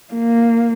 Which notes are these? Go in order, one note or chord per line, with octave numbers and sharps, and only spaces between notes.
A#3